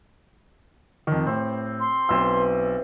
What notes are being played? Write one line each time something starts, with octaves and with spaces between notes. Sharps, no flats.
F2 D#3
A2 C4 G4
C6
B1 E3 C4 E6